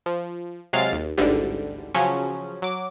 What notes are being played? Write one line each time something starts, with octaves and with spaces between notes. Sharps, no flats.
F3
C3 F#3 G#3 F5 A6
D#2
A1 D2 G#2 D3 G3
C#3 F3 F#3 C#4
F#3 D6